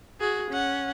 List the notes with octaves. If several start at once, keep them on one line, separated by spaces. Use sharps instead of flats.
F#4 G#4
C#4 F#5